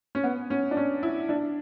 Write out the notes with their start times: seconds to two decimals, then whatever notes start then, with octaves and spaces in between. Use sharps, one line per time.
0.15 C#4
0.24 B3
0.50 C#4
0.71 D4
0.77 C#4
1.03 E4
1.29 D4